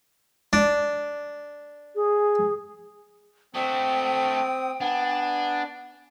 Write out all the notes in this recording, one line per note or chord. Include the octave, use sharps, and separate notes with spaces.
D4
G#4
A3 C4 F#4 G5 D#6
B3 D4 G#5